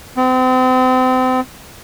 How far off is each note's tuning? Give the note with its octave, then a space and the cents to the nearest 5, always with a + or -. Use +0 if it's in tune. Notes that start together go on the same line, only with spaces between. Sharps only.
C4 -35